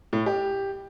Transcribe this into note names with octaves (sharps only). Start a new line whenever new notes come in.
A2
G4